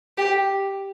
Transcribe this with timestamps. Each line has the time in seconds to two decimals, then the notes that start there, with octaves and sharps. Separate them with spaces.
0.18 G4